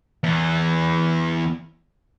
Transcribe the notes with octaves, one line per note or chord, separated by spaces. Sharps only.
E2 E3